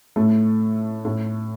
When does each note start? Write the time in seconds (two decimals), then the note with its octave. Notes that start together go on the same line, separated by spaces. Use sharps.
0.16 A2 A3
1.05 A2 A3